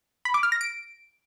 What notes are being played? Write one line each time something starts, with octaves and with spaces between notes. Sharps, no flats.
B5
D6
F6
A#6
D7